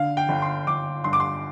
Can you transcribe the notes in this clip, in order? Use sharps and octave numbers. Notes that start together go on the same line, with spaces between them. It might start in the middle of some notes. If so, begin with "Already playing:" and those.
Already playing: D3 F5
G5
G1
C6
G1 D6
G2 C6
D6
C6